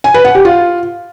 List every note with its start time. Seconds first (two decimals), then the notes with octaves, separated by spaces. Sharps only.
0.04 G#5
0.14 B4
0.25 F#5
0.35 G4
0.45 F4